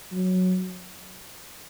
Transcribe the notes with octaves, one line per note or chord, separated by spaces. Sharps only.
F#3